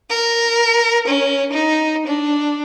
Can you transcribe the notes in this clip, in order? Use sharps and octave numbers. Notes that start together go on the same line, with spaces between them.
A#4
C#4
D#4
D4